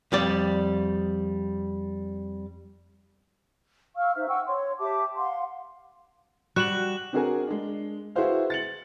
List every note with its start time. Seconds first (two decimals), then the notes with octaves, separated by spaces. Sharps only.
0.12 F2 G3 D5
3.96 F5 C#6 E6 F6
4.15 D#4 C5 E5
4.28 F#5 G5 C#6 E6
4.47 C#5 C6
4.79 G4 E5 A5 D6
5.17 F5 F#5 C6
6.56 G3 F#4 F#6 E7 F#7
7.13 C4 D4 F#4 G#4 A#4 G#5
7.47 G#3 D4
8.15 E4 F#4 G#4 B4 C5 F5
8.50 A6 C#7 F#7